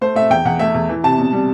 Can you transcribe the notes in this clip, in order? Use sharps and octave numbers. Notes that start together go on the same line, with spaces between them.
A3 C5
A3 E5
E2 G5
E2 F#5
A3 E5
E2
E3
C3 A5
B2
G3